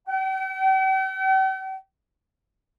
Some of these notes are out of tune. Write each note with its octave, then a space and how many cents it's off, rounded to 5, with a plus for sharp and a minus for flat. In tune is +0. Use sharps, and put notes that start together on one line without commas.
G5 -45